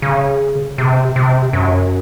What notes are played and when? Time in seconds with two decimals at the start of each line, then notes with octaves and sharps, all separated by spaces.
0.02 C#3
0.78 C3
1.16 C3
1.53 F#2